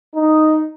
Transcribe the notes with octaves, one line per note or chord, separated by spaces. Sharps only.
D#4